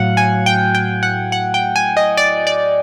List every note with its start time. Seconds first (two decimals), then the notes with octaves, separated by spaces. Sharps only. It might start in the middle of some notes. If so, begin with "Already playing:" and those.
Already playing: A2 F#3 F5 F#5
0.17 G#5
0.46 G5
0.75 G5
1.03 F#5
1.32 F#5
1.54 G5
1.76 G#5
1.97 D#5
2.17 D5
2.47 D5